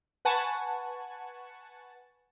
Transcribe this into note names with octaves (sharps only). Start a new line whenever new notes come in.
B4 F#5 G#5 A5 C#6